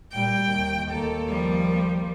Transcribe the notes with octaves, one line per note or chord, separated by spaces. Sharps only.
A#2 G3 G5
D#2
D#2 A#3 A4
F3 G3